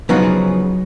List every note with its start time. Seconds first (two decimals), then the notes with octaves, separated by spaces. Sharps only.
0.09 C#3 F3 F#3 B3 D#4 G#4